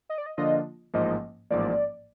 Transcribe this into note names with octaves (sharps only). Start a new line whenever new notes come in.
D#5
D5
D#5
D3 F3 A#3 D4 F4 D#5
A1 G#2 F3 A#3 D#5
A1 G#2 F3 A#3 D5